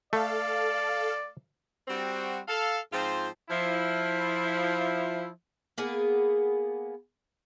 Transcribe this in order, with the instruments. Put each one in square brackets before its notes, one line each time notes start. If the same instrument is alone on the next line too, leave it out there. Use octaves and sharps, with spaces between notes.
[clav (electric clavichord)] A3 [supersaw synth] A4 F5 [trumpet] D5
[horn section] G3 C4 F#4
A4 F5
G#2 F3 C4 F4 C5
F3 E4
[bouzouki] A#3 B3 G#4